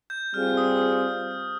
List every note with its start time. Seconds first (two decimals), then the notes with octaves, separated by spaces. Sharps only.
0.10 G6
0.34 G3 C4 F4 G#4 F6
0.57 D#6